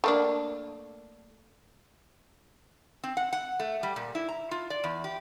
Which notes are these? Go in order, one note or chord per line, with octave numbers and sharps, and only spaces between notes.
A3 A#3 D4
C4
F#5
F#5
A3
G3
A#2
E4
A#5
F4
D5
E2
G4